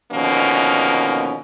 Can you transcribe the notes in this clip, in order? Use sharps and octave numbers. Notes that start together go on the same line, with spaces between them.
B2 D3 D#3 F3 A#3 C#4